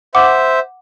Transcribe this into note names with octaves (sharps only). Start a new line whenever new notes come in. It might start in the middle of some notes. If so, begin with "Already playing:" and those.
C5 E5 F#5 D6